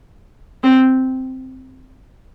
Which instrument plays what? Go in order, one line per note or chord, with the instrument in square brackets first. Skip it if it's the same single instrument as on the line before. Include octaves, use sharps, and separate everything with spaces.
[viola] C4